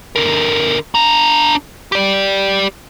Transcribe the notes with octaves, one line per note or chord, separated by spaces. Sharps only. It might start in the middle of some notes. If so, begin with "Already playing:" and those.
D3 A#4
D4 A#5
G4 D5